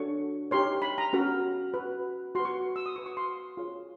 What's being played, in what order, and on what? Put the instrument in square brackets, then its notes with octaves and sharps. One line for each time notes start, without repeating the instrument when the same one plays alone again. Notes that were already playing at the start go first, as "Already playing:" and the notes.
Already playing: [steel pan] D4 F#4 A4 C#5 C#6
D#4 G4 A#4 C#5 C6
B5
A#5
C#4 F#4 A#4
F#4 B4
F#4 C6
B4
C#6
E6
D#6
F#4 B4 C#6
C#6
C6
F4 G#4 C#5